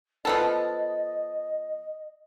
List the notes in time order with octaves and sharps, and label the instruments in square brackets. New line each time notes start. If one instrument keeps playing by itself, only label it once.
[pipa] F3 B3 A4 [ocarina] D#5